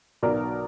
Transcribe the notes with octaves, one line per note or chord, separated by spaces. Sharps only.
B1 B2 A#4 D5